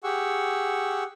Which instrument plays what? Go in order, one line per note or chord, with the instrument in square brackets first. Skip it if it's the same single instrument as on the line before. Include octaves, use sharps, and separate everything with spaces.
[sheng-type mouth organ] G4 G#4 F#5 C#6 E6